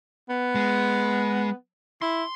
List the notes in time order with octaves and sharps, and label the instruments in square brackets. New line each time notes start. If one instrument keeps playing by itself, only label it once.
[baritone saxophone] B3
[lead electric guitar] G#3
[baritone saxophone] E4 [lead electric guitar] C6